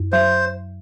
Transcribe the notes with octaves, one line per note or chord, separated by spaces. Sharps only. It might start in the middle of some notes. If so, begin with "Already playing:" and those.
Already playing: F#2
F#3 C5